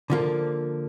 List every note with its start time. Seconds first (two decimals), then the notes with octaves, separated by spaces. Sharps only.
0.10 D3 F3 A#3